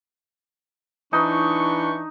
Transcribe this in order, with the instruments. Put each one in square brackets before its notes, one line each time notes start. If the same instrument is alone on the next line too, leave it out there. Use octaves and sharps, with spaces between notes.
[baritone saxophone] E3 [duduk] D4 [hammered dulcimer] D#4 [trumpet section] C#6